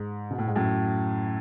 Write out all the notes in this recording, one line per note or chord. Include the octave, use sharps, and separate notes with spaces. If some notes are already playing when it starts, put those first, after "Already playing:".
Already playing: G#2
B2
A2
G#2
F#2 A2